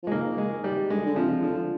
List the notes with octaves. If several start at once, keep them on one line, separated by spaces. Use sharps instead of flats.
F3
G#3
D#3 A#3
G#3
G3
D3 G#3
D3
C3 F3
D3 F3